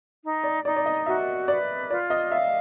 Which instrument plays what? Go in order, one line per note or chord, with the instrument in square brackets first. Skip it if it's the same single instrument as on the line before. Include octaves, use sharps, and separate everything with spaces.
[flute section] D#4
[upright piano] D5
[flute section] D#4 [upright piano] D5
[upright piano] D5
D#5
[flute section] F#4 [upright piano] E5
[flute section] B4 [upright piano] D5
[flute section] F4 [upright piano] D5
[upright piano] D#5
[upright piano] E5 [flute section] F5